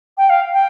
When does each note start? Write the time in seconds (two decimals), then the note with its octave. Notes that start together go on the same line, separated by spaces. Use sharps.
0.18 G5
0.30 F5
0.53 G5